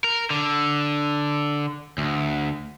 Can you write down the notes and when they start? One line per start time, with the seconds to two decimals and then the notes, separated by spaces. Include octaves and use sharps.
0.04 A#4
0.30 D3
1.98 D2